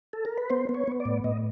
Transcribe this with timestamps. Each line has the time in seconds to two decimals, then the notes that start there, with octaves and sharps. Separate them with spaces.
0.13 A4
0.25 A#4
0.38 B4
0.50 B3 C5
0.69 B3
0.74 C#5
0.88 B3
1.00 D5
1.05 A2
1.24 A2 D#5